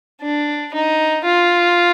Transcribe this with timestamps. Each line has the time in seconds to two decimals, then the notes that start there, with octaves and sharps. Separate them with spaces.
0.21 D4
0.73 D#4
1.25 F4